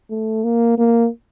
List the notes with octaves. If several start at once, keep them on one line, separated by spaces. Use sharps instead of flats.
A3
A#3
A#3